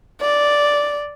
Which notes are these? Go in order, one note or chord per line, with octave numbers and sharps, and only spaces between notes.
D5